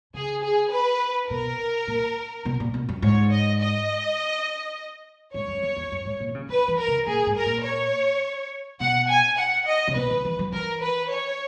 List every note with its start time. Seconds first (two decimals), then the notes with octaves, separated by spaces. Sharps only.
0.14 C#3 G#4
0.43 G#4
0.72 B4
1.30 B2 A#4
1.87 A#2
2.45 B2
2.60 A#2
2.74 B2
2.89 F#2
3.02 G#2 C#5
3.31 D#5
3.61 D#5
5.34 G#2 C#5
5.48 F#2
5.63 E2
5.76 E2
5.92 F#2
6.05 G#2
6.20 A#2
6.29 D#3
6.35 C#3
6.49 E3 B4
6.68 E3
6.78 A#4
6.88 C#3
7.07 A#2 G#4
7.26 G#2
7.36 A#4
7.46 A#2
7.65 C#5
8.80 B2 F#5
9.09 G#5
9.38 F#5
9.67 D#5
9.88 C#3
9.95 B2 B4
10.10 D#3
10.25 E3
10.39 F#3
10.52 E3 A#4
10.82 B4
11.10 C#5